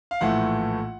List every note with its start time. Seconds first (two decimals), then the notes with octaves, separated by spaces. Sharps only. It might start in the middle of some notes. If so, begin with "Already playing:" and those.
0.11 F5
0.21 A#1 A2 E3 A3 F#5